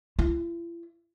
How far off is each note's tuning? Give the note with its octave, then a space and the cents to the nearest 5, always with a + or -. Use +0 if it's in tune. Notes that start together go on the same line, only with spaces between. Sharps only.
E4 +45